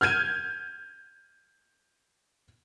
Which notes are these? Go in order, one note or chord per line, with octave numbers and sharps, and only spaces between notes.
F6 G6 G#6 D#7